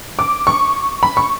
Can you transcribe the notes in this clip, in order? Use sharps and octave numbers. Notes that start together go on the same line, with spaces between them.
D6
C#6
B5
C#6